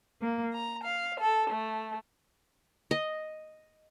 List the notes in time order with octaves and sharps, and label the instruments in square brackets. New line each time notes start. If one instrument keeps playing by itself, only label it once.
[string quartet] A#3
A#5
F5
A4
A3
[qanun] D#5